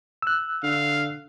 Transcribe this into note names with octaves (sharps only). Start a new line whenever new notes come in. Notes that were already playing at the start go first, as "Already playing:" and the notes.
E6 F#6
D3 F5